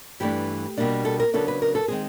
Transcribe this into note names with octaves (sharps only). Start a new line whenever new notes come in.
G2 E3 A3 D4 G4
B2 G3 A#3 D4
A4
A#4
C#3 F#3 B3 D4 A4
B4
A#4
A4
D#3 G#3 C4 G#4